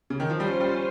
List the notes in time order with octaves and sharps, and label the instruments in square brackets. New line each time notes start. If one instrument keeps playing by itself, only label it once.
[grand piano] C#3
D#3
F3
[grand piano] G3 [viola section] C#4 F4 C5
[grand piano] G3